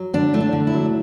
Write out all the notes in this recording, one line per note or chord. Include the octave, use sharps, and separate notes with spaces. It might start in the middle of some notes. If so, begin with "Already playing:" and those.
Already playing: F#3
D3 D4
A3 E4
D4
D3
E4
F#3